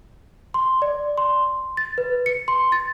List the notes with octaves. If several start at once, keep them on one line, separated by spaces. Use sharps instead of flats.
C6
D5
C6
A6
B4
C#7
C6
A6